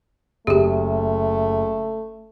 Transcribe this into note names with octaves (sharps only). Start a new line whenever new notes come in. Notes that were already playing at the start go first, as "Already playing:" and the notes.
F#1 A3 G4 G#4